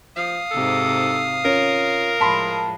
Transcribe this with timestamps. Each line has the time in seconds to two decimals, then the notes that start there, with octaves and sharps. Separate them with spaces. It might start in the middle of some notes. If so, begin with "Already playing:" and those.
0.17 F3 F5 D#6
0.51 G#2 C3 D#4 A4
1.45 C#4 F4 A#4
2.21 A2 F3 G#3 A5 B5 C6